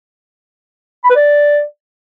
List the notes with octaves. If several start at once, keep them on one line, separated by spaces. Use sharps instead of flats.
B5
B4
D5